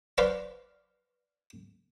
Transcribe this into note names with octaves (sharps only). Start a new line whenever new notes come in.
B4 C5 D5 F5 A#5 C#6